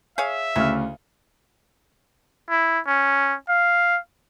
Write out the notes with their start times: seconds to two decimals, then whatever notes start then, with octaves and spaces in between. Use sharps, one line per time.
0.18 G#4 C#5 E5 F5
0.56 D2 C#3 E4 F6
2.50 E4
2.87 C#4
3.49 F5